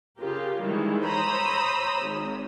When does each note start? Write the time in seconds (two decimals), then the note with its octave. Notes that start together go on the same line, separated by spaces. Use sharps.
0.19 C#3 F4 G4 A#4
0.60 D#3 E3 G3 G#3
1.05 C5 C#5 A#5 B5 D#6 E6
2.01 G#1